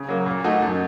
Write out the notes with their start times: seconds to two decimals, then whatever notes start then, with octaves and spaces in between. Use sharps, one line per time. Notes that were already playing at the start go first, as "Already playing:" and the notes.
Already playing: C#3
0.08 F#3 A#3
0.26 A#2
0.44 A3 D#4 F#4
0.62 F#2